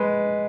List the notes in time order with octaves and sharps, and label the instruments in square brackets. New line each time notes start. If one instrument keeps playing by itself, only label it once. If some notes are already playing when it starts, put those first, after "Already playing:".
Already playing: [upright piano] G#3 B4